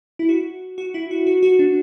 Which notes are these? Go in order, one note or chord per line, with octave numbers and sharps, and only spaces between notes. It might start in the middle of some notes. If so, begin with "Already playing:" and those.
E4
F#4
F#4
E4
F#4
F#4
F#4
D4